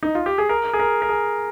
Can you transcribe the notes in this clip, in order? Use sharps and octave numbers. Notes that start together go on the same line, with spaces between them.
D#4
F4
G4
G#4
A#4
G#4
A#4
A#4
G#4